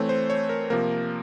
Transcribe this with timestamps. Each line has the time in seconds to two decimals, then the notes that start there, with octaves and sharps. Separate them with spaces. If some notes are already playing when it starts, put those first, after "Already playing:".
Already playing: E3 A3 C4 C#5
0.09 C5
0.30 C#5
0.49 A#4
0.70 C3 F3 A#3 A#4